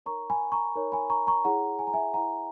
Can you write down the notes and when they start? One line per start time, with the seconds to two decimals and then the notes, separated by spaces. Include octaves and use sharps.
0.06 D#4 A#4 C#5 A#5 C#6
0.30 G#5 B5
0.52 A#5 C#6
0.76 D#4 A#4 C#5
0.92 G#5 B5
1.10 A#5 C#6
1.27 A#5 C#6
1.45 E4 G#4 C#5 F#5 A#5
1.79 G#5
1.87 A#5
1.94 E5 G#5
2.14 E4 G#4 C#5 F#5 A#5